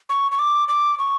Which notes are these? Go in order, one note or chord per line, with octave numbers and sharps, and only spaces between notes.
C#6
C#6
D6
D6
C#6